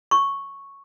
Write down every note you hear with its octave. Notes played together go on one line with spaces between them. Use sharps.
C#6